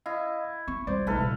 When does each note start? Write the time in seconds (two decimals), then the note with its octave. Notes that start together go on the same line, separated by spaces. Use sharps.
0.06 E4 D#5 F5
0.68 C4 C#6
0.87 C#2 G3 C5 D5
1.07 E1 A#1 A3 D#4 A4 B4 F5
1.18 C2 A#2 F3